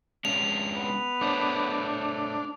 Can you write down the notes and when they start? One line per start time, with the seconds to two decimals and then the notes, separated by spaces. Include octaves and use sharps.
0.25 G#3 C#4 D4 F7
0.75 B3
1.21 A3 D4 C5 C#5